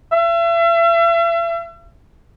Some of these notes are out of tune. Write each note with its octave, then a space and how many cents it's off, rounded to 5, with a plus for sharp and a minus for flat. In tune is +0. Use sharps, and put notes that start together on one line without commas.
E5 +40